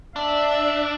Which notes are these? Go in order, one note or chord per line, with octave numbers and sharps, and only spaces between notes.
D4 E5